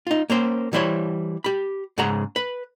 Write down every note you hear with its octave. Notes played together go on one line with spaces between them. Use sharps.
D#4 F4
A#3 C#4 C5
E3 G3 E4 C5 C#5
G4 B5
G#2 C#3 G#3 F#5 A#5
B4